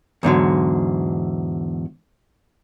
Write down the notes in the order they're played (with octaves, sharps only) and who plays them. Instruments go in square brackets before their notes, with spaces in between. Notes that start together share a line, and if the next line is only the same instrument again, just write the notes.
[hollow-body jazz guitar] E2 G#2 D3 F#3